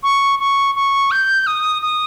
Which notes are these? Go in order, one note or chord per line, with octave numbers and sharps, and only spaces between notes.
C#6
C#6
C#6
G6
D#6
D#6